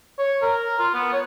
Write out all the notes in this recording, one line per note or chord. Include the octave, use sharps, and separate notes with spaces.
C#5
A#4
F4
B3
C#5